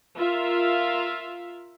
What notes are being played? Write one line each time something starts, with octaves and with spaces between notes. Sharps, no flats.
F4 A#4 E5 F5